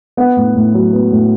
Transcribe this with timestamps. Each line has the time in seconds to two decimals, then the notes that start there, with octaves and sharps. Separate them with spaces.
0.17 B3 F#5
0.37 A2
0.56 A2
0.74 F#3
0.93 B3
1.12 A2